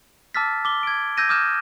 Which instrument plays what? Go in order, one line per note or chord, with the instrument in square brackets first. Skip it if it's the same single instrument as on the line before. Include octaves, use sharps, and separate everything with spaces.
[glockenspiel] A5 D6 E6 F6 A6 B6
D6 G7
G#6 D7
E6 G6 G#6 A#6 D#7
D6 D#6 F6 G6 E7